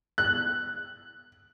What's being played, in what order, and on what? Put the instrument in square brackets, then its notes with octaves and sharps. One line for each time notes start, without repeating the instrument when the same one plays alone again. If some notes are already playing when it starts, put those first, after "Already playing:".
[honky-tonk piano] F#6